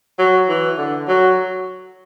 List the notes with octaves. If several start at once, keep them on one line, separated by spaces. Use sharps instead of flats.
F#3
E3
D3
F#3